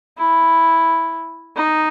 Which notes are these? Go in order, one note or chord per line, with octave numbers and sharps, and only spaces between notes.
E4
D#4